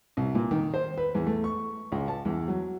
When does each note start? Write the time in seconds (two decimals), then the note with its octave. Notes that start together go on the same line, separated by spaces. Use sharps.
0.17 C2
0.35 A#2
0.51 D#3
0.74 C5
0.98 B4
1.15 E2
1.26 A3
1.44 C#6
1.92 C#2
2.08 A5
2.25 E2
2.48 F#3